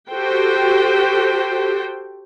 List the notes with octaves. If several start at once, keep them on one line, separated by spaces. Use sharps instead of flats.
F#4 G4 A4 C5 G5